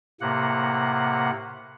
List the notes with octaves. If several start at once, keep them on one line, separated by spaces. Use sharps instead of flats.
A2 C3 A#3 F#5